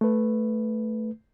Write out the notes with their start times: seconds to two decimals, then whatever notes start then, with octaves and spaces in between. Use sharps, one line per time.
0.01 A3 B4